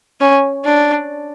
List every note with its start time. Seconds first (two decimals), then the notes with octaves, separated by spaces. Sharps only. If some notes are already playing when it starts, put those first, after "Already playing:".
0.20 C#4
0.65 D4